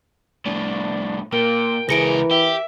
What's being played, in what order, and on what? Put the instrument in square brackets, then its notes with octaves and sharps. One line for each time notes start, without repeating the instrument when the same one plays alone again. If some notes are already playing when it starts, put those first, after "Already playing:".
[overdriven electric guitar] C2 A2 [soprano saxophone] D4
[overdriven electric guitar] A#2 [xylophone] A#4 [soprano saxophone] G5
[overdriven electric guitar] C#2 A#4 [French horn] E3 [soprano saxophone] G#4 [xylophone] A#6 C#7 D7
[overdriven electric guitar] G4 [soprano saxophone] E5